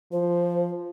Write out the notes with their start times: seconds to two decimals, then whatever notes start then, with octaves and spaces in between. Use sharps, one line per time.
0.12 F3 C5